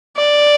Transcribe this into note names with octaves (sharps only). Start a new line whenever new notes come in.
D5